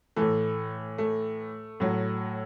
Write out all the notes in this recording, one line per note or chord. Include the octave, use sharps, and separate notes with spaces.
A2 E3 A3
A3
A2 F#3